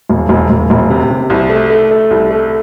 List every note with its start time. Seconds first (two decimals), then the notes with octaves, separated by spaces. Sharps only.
0.10 E1
0.29 E1
0.50 E1
0.70 E1
0.90 C3
1.10 C3
1.30 C2
1.50 A3
1.70 A3
1.91 A3
2.11 C2
2.31 A3